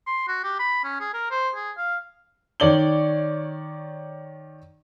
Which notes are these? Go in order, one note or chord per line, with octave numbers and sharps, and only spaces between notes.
C6
F#4
G4
B5
C#4
G#4
A#4
C5
G#4
F5
D#3 C#5 D5 F#7 G7